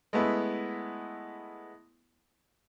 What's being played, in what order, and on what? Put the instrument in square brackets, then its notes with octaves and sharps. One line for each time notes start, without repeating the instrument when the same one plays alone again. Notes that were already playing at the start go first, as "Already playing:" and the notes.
[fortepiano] G#3 A3 B3 E4